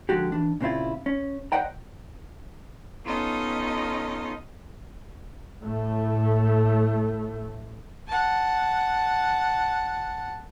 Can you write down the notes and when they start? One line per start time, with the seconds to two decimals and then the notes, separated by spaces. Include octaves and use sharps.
0.09 D3 F3 G#3 F#4 G4
0.32 E3 D4
0.61 A#2 C#3 C4 E4 F4
1.06 C#4
1.52 C5 D5 D#5 F#5 G5 A#5
3.05 B3 C#4 D#4 F4 A4 D#5
5.62 A2 A3
8.08 F#5 A5